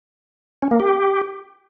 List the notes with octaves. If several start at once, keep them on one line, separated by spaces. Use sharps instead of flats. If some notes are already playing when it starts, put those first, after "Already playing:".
C#4
A#3
G4